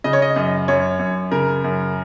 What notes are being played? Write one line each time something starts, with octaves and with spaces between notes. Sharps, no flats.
C#3 D#5
C#5
D#5
F#2
F#2 C#5
F#2
C#3 A#4
F#2